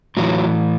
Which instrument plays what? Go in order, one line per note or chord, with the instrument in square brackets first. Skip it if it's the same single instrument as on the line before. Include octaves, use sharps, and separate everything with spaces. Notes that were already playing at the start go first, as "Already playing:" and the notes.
[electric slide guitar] A2 E3 F#3